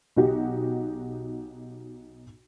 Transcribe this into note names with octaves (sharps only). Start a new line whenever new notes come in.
B1 D#4 F#4 G4